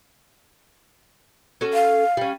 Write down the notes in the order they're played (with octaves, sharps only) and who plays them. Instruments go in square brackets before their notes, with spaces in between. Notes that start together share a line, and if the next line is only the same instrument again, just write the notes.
[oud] C#4 F#4 A4
[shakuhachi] F5
[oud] G3 C#4